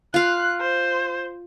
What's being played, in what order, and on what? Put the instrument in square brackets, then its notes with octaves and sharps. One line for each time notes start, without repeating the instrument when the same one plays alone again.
[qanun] F4 F5 [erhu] F#6
[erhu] C5